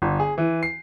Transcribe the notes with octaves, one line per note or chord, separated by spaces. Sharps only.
G1
G#4
E3
C7